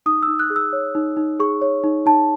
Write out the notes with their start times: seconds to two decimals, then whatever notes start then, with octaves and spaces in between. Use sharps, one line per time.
0.06 D#4 D#6
0.23 E6
0.28 D#4
0.39 F#6
0.50 G#4
0.56 E6
0.73 C#5
0.95 D#4
1.17 D#4
1.40 G#4 C#6
1.62 C#5
1.84 D#4
2.06 D#4 A5